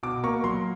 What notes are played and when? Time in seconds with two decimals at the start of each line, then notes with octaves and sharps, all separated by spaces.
0.03 B2 D6
0.24 A#3 C#6
0.44 F#3 C6